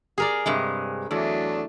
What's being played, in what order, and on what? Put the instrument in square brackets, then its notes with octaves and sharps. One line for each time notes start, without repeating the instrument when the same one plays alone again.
[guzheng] G#4 A#4 D5
[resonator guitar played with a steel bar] G2 C3 G#3
[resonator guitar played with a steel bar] E2 [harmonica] F#3 A3 D4